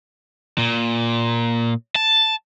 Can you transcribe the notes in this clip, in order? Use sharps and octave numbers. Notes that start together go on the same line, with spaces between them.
A#2
A5